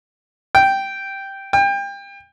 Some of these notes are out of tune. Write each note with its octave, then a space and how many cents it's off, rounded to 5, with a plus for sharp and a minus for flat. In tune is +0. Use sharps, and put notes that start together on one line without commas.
G5 -5
G5 +30